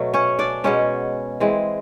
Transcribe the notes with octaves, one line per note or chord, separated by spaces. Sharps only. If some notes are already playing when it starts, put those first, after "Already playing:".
Already playing: B2 F#3 A3
C#4 C#5
D4 D5
B2 G#3 B3 C#4 C#5
E3 G#3 C4